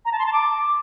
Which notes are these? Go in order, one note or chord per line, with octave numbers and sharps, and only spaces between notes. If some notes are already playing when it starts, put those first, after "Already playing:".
A#5
A5
C6
A5
D6